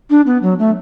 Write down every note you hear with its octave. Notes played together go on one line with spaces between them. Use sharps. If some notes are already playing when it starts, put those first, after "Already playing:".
D4
B3
F#3
A3